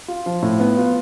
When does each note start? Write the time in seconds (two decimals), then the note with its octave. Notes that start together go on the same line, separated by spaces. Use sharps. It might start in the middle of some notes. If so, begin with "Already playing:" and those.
0.08 F4
0.26 F3
0.43 A2
0.60 B3
0.78 F4